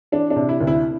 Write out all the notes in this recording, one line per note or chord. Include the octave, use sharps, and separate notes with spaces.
E3 D4
D4
C3
E4
D2
E4